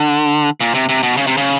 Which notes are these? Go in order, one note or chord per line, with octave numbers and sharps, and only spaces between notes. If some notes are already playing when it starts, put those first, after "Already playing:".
Already playing: D3
A#2
C3
C3
B2
C#3
C3
C#3